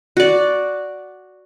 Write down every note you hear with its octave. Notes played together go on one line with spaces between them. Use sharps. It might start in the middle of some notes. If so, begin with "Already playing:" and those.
F#4 D5